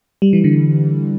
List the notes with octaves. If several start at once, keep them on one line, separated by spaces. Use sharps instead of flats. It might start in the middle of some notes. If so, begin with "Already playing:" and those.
G3
E3
D3